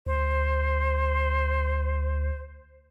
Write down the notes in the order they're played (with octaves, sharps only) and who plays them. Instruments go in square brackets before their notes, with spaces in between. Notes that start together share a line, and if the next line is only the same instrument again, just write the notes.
[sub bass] D2 [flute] C5